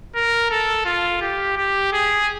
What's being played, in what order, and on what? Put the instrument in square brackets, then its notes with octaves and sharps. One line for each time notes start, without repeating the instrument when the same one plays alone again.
[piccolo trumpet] A#4
A4
F4
G4
G4
G#4